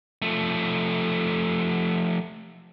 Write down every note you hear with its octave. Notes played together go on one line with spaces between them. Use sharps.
F3 A3